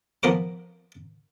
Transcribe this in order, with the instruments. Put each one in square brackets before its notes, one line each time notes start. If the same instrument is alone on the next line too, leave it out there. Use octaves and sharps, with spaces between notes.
[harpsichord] F3 B3 A#4 C5 D6